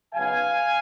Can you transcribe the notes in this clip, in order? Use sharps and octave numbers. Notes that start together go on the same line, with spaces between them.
C#3 F#3 B3 D#4 F5 G#5